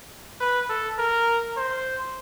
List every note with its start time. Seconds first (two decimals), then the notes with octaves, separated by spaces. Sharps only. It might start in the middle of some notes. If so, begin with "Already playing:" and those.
0.40 B4
0.69 A4
0.98 A#4
1.57 C5